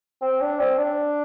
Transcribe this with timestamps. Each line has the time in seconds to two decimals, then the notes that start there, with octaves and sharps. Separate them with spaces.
0.22 C4
0.41 D4
0.59 C4
0.78 D4